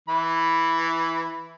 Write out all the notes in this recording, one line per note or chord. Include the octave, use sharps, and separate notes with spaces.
E3 B5